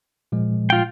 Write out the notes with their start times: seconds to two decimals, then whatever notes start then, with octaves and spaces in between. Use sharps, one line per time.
0.32 A#2 F3 G#3
0.70 F4 G5